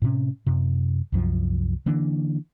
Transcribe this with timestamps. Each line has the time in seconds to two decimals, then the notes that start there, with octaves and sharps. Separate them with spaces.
0.02 A2 C3 C#4
0.47 F#2 C3
1.12 C2 F#2 F3
1.86 D3 E3 A#3 D4